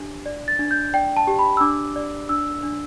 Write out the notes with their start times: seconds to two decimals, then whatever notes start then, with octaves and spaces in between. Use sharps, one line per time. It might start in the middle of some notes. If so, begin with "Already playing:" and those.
Already playing: D4 G4
0.26 D5
0.48 A6
0.59 D4
0.71 G6
0.93 D5 G5
1.17 A5
1.27 G4
1.39 B5
1.57 E6
1.61 D4 D6
1.96 D5
2.29 D4 E6
2.63 D4